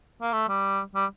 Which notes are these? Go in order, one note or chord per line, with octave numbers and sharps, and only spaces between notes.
A#3
A3
G3
G3